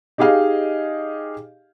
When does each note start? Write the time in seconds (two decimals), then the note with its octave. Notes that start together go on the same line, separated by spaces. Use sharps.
0.18 D#4 G4 G#4 D#5 F5